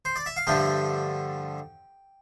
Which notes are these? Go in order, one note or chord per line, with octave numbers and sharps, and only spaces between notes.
C5
D5
E5
F5
G2 D3 F3 A3 G5